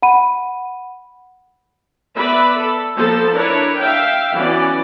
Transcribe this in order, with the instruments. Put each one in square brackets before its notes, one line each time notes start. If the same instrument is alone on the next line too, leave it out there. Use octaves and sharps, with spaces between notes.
[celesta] F#5 B5 D#7
[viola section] B3 B4 D5 E5 B5
A4
F3 A#3 B3 A4 C5 A5
D4 E4 A#4 B4 C#5
E5 F5 G5
E3 F#3 B3 C#4 D5